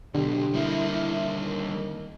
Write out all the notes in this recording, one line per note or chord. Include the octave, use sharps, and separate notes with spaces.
B1 B2 D3 G4
G3 A#3 E4
E4
D#3